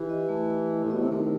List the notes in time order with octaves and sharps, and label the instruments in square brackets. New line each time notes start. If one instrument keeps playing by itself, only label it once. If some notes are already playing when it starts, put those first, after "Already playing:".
Already playing: [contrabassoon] E3 [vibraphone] G4
[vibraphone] D#5
A3
E4
G4
[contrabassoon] A2
[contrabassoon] B2 [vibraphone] D#5
[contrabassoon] C3
[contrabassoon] D#3 [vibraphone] A3